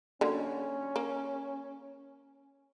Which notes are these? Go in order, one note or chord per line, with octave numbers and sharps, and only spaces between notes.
D3 F#3 A#3 C#4
A#3